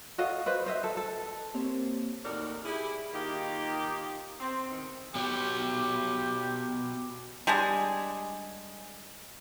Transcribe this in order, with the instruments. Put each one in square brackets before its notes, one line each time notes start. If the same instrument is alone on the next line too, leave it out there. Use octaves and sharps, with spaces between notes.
[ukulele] F#4 A4 D#5 F5
B4 C5 D#5
C5 D#5 E5
A4
A4
[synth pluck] A#3 C4 G4 C5 C#5
[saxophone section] D#2 A2 D#4 F#4 A#4 D5
E4 G4 G#4
D#3 A#3 D#4 F4 G4
C4
E2 D#3 C4
[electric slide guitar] B3 F#4 C#5 [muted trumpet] G4
[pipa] G3 G#3 D4 G#4